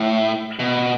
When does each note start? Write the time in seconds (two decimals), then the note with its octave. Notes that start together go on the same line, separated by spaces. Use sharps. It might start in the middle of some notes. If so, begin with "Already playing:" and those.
Already playing: A2
0.59 B2